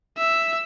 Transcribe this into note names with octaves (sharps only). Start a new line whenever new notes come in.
E5